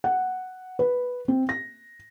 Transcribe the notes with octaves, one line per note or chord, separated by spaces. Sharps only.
F#5
B4
C4
A#6